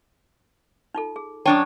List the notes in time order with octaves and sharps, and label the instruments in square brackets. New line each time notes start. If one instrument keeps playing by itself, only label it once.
[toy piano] D#4 F4 A4
G#4
[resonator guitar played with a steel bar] F#2 D4 C#5 [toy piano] G5 A5 C#6